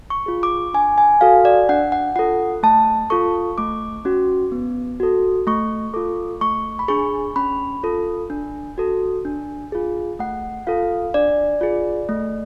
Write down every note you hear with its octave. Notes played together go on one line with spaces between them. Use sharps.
C#6
F4 G#4
D6
D4 G#5
G#5
F#4 A4 F5
D5
D4 F#5
F#5
F4 A4 F#5
A3 A5
F4 A4 C#6
A3 D6
C#4 F#4
B3
F#4 A4
A3 C#6
F4 A4 D6
A3 C#6
B5
D4 G#4 C#6
C#4 B5
F4 A4
D4
F#4 A4
D4
F4 G#4
A3 F#5
F4 A4 F5
D4 D5
F4 G#4
A3